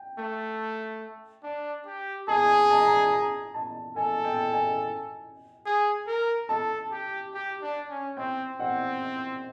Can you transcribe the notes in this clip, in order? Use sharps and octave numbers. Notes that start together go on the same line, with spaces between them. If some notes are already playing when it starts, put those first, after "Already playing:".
Already playing: G5
A3
D4
G4
G#4 A5
A5
A#5
A5
A#5
A5
A4 G#5
G5
G#5
G#4
A#4
A4 A5
G4
G4
D4
C#4
C4 G5
C4 F#5